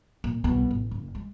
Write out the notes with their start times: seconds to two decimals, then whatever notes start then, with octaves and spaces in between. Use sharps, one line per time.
0.24 A#2
0.44 C2 B2
0.71 A1
0.91 F#1
1.15 G#3